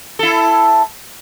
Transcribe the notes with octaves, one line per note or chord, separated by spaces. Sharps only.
E4 A4